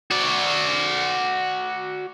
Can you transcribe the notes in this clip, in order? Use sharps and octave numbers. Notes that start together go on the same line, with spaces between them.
F#4 D5